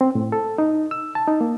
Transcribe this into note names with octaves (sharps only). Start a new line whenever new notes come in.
C4
A2
A4
D#4
E6
A5
D#4
A#3